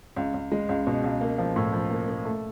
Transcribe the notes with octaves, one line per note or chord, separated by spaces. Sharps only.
C#2
C#2
G#3
C#2
B2
C#2
A#3
F3
A2
F3
A#3
A#3
A3